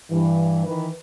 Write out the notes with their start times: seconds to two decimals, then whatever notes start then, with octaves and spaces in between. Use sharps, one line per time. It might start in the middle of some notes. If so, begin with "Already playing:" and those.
0.11 G2 E3
0.66 D#3 E3 B4